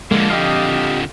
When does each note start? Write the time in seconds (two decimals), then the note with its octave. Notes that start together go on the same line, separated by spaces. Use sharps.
0.11 F2 D3 G#3 A#3
0.30 G4 D#5 F5